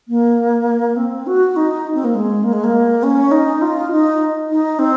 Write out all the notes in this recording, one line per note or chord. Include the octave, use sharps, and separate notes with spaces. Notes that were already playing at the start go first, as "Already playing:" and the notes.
A#3
C4
F#4
D#4
C4
A#3
G#3
A#3
G#3
A#3
C#4
D#4
F4
D#4
D#4
C4